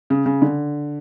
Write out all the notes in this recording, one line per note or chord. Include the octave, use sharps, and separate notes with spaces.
C#3
C#3
D3